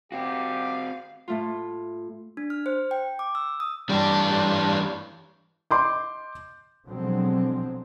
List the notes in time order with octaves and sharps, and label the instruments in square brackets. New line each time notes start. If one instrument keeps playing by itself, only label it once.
[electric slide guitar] C4 F#4 [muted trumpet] G4 [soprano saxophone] F5
[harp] A2 A3 F4
[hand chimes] D4
F6
C5
G5
D6
E6
D#6
[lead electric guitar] E3 G4 [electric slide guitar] G3 D4
[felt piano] D#5 C6 D6 G6
[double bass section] B2 D3 F3 F#3 G#3 C4